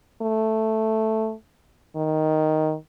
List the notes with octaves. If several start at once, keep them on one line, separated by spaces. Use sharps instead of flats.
A3
D#3